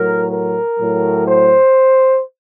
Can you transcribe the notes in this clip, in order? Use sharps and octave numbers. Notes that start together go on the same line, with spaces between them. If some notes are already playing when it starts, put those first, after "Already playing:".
Already playing: A2 F#3 A#4
A#4
A2 F#3
C5